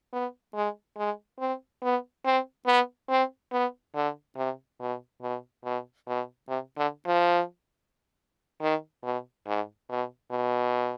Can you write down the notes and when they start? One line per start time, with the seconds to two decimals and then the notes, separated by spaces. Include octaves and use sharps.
0.13 B3
0.54 G#3
0.97 G#3
1.40 C4
1.83 B3
2.25 C4
2.67 B3
3.09 C4
3.52 B3
3.95 D3
4.36 C3
4.80 B2
5.22 B2
5.65 B2
6.07 B2
6.49 C3
6.77 D3
7.07 F3
8.61 D#3
9.04 B2
9.47 G#2
9.90 B2
10.31 B2